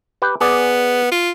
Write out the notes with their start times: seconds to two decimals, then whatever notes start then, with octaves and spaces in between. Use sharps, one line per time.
0.22 G4 B4 G5
0.41 B3 G#4 D5
1.11 F4